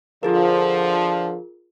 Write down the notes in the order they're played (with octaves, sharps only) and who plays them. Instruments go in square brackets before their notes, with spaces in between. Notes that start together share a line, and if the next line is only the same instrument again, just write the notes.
[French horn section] D3 F3 [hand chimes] F4 G#4 A#4